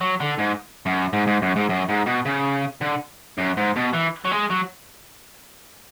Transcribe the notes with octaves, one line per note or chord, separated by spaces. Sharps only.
F#3
D3
G#2
F#2
G#2
G#2
F#2
G#2
F#2
G#2
B2
C#3
D3
F#2
G#2
B2
E3
F#3
G#3
F#3